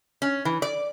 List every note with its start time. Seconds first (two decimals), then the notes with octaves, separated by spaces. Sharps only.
0.22 C#4
0.45 E3
0.62 D5